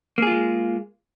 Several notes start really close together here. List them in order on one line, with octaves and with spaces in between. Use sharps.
A#3 G#4 F4 G#3